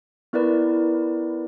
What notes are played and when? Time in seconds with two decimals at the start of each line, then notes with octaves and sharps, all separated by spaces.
0.33 B3 E4 A#4 B4 D5